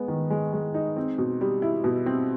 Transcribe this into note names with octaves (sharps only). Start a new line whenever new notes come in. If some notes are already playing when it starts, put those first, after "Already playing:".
Already playing: G#3 B3
D#3
G#3
G#3
D#4
C4
B2
G3
E4
B2
C4